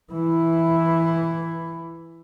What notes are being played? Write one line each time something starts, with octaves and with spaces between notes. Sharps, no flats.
E3 E4